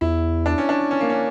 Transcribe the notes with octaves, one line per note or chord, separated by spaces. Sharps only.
E2 E4
D4
C#4
D4
C#4
A#3
C#4